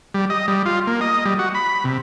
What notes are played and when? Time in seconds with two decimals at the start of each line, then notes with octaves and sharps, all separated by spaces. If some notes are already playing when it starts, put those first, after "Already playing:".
0.14 G3
0.30 D#5
0.48 G3
0.65 F4
0.87 A#3
1.01 D#5
1.25 G3
1.39 F#4
1.55 B5
1.84 C3